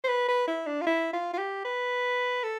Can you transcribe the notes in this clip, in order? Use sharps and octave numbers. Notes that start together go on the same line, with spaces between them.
C5
B4
B4
E4
D4
F4
E4
F4
F4
G4
B4
A4